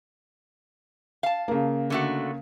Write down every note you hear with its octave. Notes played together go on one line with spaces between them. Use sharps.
F5 A5
C#3 A#3
D3 A3 F#4